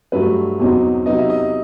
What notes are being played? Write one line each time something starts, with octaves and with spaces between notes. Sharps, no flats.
G2 F#3 A3 B4
E2 B2 F#3 C4 D#4
C3 F#3 B3 D#4 D#5
E5
D#5